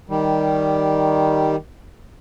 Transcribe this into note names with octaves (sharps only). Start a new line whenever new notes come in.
D#3 G3